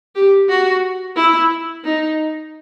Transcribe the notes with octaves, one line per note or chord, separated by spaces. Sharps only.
G4
F#4
E4
D#4